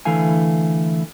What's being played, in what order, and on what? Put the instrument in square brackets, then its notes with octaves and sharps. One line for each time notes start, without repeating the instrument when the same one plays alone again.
[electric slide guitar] D3 E3 A3 E4 F5 G#5